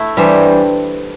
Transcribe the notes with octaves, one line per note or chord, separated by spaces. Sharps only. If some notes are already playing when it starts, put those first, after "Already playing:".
Already playing: A3 E4
E3 G3 D4 C5